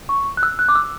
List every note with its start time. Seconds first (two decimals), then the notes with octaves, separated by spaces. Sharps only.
0.09 C#6
0.37 F#6
0.43 E6
0.59 F#6
0.69 D6
0.75 E6